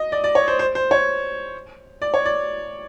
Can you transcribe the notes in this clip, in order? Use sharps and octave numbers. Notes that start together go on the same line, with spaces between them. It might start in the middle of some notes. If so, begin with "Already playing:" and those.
Already playing: D#5
D5
D5
C#5
C5
C5
C5
C#5
D5
C#5
D5